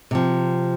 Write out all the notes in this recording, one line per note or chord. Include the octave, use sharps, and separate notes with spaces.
C3 F3